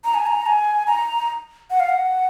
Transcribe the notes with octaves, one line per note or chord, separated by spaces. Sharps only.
A#5
G#5
A#5
G#5
A#5
F#5
F5
F#5